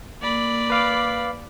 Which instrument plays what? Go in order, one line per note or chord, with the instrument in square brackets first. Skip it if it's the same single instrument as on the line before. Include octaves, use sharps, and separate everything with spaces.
[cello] A#3 [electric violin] D5 B5
[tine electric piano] B4 F5 D6